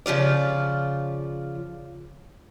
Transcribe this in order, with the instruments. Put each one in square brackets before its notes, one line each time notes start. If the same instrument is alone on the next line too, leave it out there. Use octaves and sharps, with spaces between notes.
[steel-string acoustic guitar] C#3 F3 F4 D5